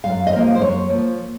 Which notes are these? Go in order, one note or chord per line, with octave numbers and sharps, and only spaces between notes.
F#2 F5
D#5
F3 A#3 F5
D#5
C5
F#2 C#5
F3 A#3